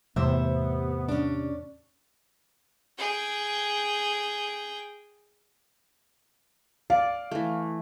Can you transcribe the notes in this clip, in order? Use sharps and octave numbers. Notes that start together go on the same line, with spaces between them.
E2 A2 C3 B3 C5 E5
C#4 D4
G#4 G5
D5 F5
E3 A3